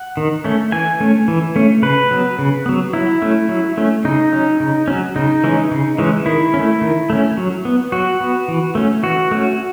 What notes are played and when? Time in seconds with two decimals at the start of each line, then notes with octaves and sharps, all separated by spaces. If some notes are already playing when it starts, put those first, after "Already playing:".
Already playing: F#5
0.17 D#3
0.44 A3 C#4
0.72 E3 G#5
1.00 A3 C#4
1.28 E3
1.56 A3 C#4
1.82 C#3 B4
2.11 F#3 B3
2.39 C#3
2.66 F#3 B3
2.93 F#3 E4
3.22 A3 C#4
3.49 F#3
3.77 A3 C#4
4.05 C#3 D#4
4.32 F#3 C#4
4.60 C#3
4.88 F#3 C#4
5.16 C#3 D#4
5.44 E3 G#3 C#4
5.71 C#3
5.98 E3 G#3 C#4
6.26 D#3 E4
6.54 C#4
6.59 A3
6.81 D#3
7.10 A3 C#4
7.37 F#3
7.65 B3
7.92 F#3 F#4
8.21 B3
8.48 E3
8.75 A3 C#4
9.03 E3 F#4
9.31 A3 C#4